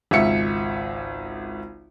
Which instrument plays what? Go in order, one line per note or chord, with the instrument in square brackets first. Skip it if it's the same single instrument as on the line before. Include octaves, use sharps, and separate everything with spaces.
[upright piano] G#1 C#2 E5 C#7